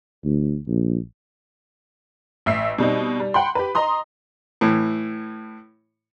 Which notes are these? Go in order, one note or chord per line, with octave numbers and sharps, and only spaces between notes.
D2
A#1
A1 E5 E6 C7
B2 G3 C4 D#4
G3
F#5 G5 B5 C6
G4 B4
D#5 A#5 C6 D#6
A2 E3